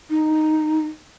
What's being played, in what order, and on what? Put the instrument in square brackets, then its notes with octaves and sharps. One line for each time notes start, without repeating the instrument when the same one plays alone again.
[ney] D#4